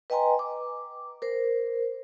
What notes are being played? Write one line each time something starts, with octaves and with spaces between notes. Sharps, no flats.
B4 D#5 G5 G#5 A#5 C6
D6
A#4 C5